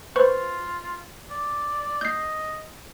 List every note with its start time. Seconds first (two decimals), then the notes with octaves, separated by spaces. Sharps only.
0.16 F4 B4 C5 C#6
1.31 D5
2.01 D#5 G6 C7